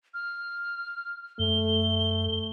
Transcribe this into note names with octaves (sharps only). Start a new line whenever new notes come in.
F6
F#2 A3 G7